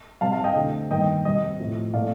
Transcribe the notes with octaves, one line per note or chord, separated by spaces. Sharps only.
C3 G3 C4 F5 A5
F5 A5
D#5 G5
D3 A3 C4
G2 D#3 A#3 D#5 G5
C3 G3 C4 D#5
A2 F3 C4
A#2 A3 C4 D5 F5